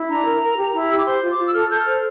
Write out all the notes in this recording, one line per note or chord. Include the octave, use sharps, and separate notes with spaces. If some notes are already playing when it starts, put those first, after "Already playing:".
Already playing: E4
D4 A#5
A#4
A#4
G4
E4
G4 E6
D6
C5 C6
F4
D6
F4
E6
A4 F6
A4 G6
F6
C5